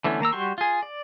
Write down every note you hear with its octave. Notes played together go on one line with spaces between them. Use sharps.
D3 E3 A3 B3 C#4
D#3 A#3 A#5 E6
G3 F#4 G4 C6 C#6
F4 G#4
D5